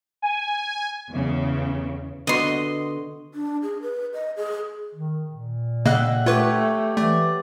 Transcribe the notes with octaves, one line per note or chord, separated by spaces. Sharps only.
G#5
E2 C#3
D3 B3 F#4 D#5 C6
D4
G#4
B4
D#5
G#4
D#3
A#2
C#3 A#3 D#5 E5 F#5 G5
A3 F4 G4 B4 C#5
E3 A3 D5